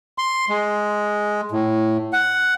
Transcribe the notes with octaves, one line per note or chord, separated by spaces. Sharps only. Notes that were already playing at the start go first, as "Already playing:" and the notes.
C6
G#3
A2
F#5